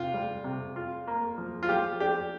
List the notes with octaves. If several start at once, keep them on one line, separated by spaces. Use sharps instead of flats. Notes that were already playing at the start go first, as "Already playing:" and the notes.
Already playing: C3 F4
G3
C3
F4
A#3
F3
F4
F3 G4
D4 G4